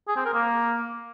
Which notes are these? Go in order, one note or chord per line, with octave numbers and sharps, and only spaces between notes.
G#4
C4
A#4
A#3